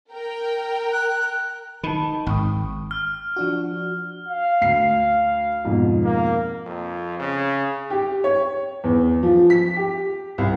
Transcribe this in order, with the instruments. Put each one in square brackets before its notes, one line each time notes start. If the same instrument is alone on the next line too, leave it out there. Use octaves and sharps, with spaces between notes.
[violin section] A#4 G5
[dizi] F#6
[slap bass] D#3 [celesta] A5 B5
[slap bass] G#1 [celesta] G5 C#6 D#6
[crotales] F6
[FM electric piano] F3 D4 F#4
[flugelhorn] F5
[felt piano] D2 C7
F2 G#2 B2
[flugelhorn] A#3
[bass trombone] F2
C#3
[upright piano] G4
C#5
E2
F3
B6
G4
C2